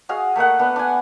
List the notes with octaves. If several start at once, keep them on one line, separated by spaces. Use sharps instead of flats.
F#4 G#4 D#5 F5
A3 A#3 D#5 F#5
B3 D4
D4 G#5